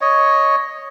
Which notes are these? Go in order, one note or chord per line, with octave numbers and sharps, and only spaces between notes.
C#5 D#5